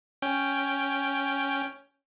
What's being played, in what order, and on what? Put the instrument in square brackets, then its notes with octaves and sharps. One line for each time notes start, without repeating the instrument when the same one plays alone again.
[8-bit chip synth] C#4 G5